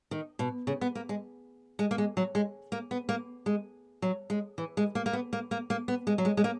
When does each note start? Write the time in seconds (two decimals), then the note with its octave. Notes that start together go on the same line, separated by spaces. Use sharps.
0.11 D#3
0.39 B2
0.67 C#3
0.81 B3
0.95 A#3
1.09 G#3
1.79 G#3
1.91 A#3
1.98 G#3
2.17 F#3
2.35 G#3
2.72 A#3
2.91 B3
3.09 A#3
3.46 G#3
4.02 F#3
4.30 G#3
4.58 E3
4.77 G#3
4.95 A#3
5.06 A#3
5.13 B3
5.33 A#3
5.51 A#3
5.70 A#3
5.88 B3
6.07 G#3
6.18 F#3
6.25 G#3
6.37 G#3
6.44 A#3